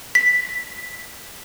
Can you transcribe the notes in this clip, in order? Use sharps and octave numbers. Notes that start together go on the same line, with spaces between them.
B6